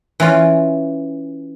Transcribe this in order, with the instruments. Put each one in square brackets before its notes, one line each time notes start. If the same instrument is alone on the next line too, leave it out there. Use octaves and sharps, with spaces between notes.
[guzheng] E3 C#4 F4